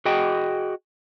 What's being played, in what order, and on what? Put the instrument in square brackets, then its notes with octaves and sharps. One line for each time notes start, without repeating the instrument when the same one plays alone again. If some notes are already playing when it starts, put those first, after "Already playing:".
[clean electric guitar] F#4 G#4 D#5 G5